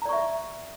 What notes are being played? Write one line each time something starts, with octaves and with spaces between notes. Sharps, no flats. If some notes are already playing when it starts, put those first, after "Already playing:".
D5 E5 A#5 C#6